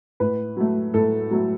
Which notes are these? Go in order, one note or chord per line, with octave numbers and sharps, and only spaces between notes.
A2 B4
F#3 A3
A2 A4
F#3 A3